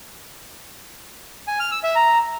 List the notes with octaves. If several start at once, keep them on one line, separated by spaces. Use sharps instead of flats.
G#5
F6
E6
E5
A#5